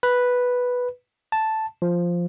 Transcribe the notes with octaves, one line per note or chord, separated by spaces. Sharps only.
B4
A5
F3